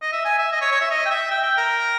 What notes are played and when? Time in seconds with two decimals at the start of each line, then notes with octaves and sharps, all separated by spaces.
0.02 D#5
0.12 E5
0.25 G#5
0.38 E5
0.52 D#5
0.61 C#5
0.72 C#5
0.81 E5
0.91 D#5
1.05 G5
1.10 E5
1.31 G5
1.43 G5
1.57 A#4